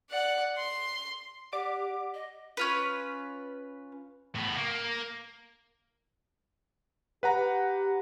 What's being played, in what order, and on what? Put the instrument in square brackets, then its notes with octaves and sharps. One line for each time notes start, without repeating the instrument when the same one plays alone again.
[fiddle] D5 F#5
C6
[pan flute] G4 [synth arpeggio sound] D5 D6 [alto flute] F#5
[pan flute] D#5
[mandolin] C#4 F4 B4
[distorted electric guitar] A2 B3
A#3
[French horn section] G4 [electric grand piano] B4 F#5 A#5